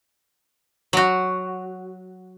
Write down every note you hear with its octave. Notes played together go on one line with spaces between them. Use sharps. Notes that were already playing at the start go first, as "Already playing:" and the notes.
F#3 F#4